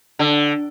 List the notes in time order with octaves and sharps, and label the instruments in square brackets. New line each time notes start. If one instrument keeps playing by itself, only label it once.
[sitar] D3